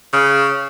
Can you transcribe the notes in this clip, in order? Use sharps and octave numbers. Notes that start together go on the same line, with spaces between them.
C#3